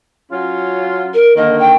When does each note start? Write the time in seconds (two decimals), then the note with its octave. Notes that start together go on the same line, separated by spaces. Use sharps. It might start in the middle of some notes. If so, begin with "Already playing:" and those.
0.32 F#3 C#4 F4
1.14 A#4
1.37 D3 D#3 A#3 D#5
1.59 G5